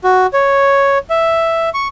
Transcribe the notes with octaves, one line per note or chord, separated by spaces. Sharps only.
F#4
C#5
E5
C#6